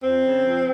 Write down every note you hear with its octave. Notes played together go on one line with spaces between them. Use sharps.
F2 C4
C#3
F2